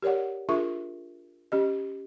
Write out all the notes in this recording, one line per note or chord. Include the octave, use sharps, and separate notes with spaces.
G4 A#4 C#5 D5 F#5
D4 F4 G#4 A#4 E5 C#6
C#4 G4 D#5